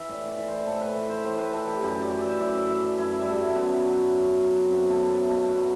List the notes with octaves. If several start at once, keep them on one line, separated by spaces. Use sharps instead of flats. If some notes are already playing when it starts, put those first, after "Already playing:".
Already playing: E3 E5
A2 D5
D5
E3
C5
A2 A4
B4
E3
C5
A2 C5
B4
E3 A4
G4
F#2 G4
D5
E3
E5
E5
F#2 D5
D5
E3 E5
D5
F#2 E4
G3
F#3 A3
F#2 B3
F#3
F#2
F#3
C4
F#2 B3
A3
F#3
B3
B2 A3
F#4
F#3